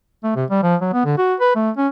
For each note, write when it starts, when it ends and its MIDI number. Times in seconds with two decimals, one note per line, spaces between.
0.23 0.31 57
0.36 0.44 48
0.50 0.61 55
0.63 0.76 53
0.81 0.89 54
0.93 1.04 59
1.05 1.15 50
1.18 1.35 66
1.40 1.51 71
1.55 1.70 57
1.77 1.88 61